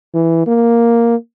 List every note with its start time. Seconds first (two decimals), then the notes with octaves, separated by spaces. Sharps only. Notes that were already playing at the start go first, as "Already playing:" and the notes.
0.15 E3
0.47 A#3